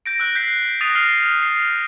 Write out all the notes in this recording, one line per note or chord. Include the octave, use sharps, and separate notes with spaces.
G6 A#6 D7
E6 F#6 A#6
G6 B6 C7
D#6 A6 A#6 C7 D#7 F7
F6 A6 A#6 C7 F7
C7